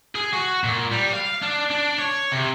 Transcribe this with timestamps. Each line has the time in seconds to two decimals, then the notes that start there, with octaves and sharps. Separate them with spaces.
0.15 G#4
0.33 F#4
0.64 A#2
0.92 G3
1.13 F5
1.42 D4
1.71 D4
1.98 C#5
2.32 C3